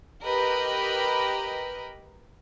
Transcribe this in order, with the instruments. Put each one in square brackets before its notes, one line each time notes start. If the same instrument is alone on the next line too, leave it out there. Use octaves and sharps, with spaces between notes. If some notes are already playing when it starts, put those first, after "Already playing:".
[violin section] G4 A#4 B4 D#5 B5